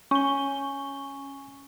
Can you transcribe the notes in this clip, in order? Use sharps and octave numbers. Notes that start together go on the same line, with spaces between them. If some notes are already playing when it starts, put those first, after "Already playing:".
C#4 G#5 C#6 G7